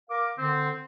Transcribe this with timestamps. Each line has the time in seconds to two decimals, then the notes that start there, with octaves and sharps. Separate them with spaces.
0.09 A#4 F5 D6
0.38 D3 C4